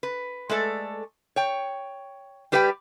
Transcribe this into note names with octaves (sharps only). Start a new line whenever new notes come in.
B4
G#3 A3 A4 D5
C#5 G5
G3 G4 B4 D5 F#5 G5